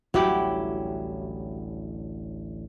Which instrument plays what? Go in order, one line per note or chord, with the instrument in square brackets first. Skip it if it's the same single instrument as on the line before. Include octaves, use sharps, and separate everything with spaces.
[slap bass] A1 D2 G3 [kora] F#3 E4 G4 [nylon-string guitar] F#4 G5